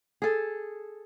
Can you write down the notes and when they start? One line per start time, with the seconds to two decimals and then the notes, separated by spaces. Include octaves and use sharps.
0.22 G#4 A4